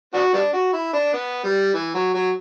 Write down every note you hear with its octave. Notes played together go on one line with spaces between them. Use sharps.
B3 D4 F#4
G3 B3 D4
F#4
E4
D4
B3
G3
E3
F#3
F#3